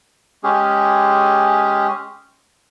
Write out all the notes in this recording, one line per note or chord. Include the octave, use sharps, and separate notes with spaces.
G#3 C#4 G4 G#4